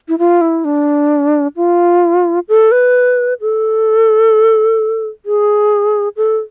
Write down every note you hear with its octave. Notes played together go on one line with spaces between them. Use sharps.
E4
F4
E4
D4
F4
A4
B4
A4
G#4
A4